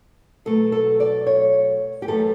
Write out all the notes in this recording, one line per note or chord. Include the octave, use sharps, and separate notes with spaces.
B2 F#3 A3 A4
A4
D5
C#5
G4
F#2 E3 A3 A4